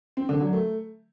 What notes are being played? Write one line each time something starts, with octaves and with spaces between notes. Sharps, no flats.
C4
D3
F#3
A3